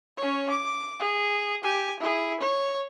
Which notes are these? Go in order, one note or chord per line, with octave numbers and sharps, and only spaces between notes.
C#4 C#5
D6
G#4
G4 G#5
E4 G#4
C#5